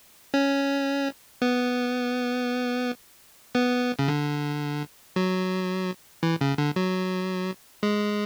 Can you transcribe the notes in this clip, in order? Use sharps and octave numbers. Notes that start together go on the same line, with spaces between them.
C#4
B3
B3
C#3
D3
F#3
E3
C#3
D3
F#3
G#3